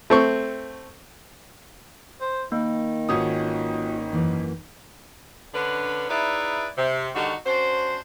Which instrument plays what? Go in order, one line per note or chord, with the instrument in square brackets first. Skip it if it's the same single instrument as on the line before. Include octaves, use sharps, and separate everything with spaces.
[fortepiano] A3 C4 C#6
[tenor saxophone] C5
[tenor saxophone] D#3 [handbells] A#3
[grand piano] G#1 C#4 D#6 [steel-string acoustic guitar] F4 F#4 B4
[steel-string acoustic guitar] F#2 E3 A#3
[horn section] D3 C#4 D4 B4
D#4 E4 G#4 B4 D5 E5
C3
D3 D#3 G3 D#4 F#4
C#4 D4 F#4 C5